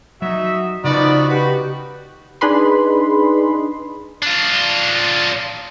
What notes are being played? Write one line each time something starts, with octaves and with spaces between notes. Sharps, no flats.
F#3 D#4 F#4 E5
C#3 F3 B3 D#4 F#4 D5 B5
F#4 G4 B4
D4 D#4 G#4 B4 B5 C6
D4 F4